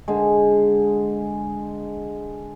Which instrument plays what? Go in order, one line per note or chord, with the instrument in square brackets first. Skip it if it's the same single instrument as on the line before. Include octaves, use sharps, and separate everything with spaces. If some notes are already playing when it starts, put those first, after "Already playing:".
[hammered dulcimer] D3 G#3